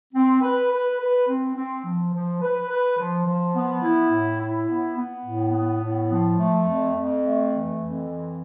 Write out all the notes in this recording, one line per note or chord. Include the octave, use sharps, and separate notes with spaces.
C4
B4
B4
B4
C4
C4
F3
F3
B4
B4
F3
F3
B3
E4
A2
E4
B3
B3
A2
B3
A2
F3
A3
F2
F2
A3
E3
F2
E3